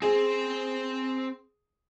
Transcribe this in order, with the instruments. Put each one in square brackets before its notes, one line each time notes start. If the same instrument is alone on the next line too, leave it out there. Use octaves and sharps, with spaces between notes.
[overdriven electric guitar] C4 C5 [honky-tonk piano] G#4